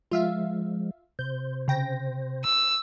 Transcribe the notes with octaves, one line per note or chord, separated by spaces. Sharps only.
F3 G#3 F4 E5 F5
C3 C5 G6
C#3 G5 A#6
E6